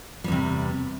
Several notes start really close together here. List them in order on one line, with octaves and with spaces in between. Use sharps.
G3 E2 C3